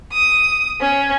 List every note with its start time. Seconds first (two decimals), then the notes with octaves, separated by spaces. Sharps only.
0.12 D#6
0.81 C#4